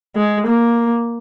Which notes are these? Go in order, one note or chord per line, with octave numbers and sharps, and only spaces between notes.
G#3
A#3